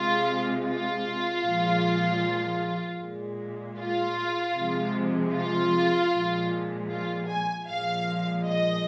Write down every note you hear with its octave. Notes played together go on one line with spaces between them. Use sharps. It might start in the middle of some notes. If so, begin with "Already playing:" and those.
Already playing: C3 G#3 F4
F4
A#2 F3 G#3
A#2 G#3
F4
C3 F3 G#3
F4
A#2 F3 G#3
F4
G#5
A#2 F3 G#3 F5
D#5